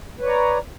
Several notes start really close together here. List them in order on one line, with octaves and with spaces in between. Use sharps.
B4 C#5 D5 A#5